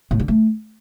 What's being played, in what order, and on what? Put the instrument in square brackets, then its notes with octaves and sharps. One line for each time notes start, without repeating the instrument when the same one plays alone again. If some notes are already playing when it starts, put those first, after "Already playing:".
[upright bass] A2
D3
A3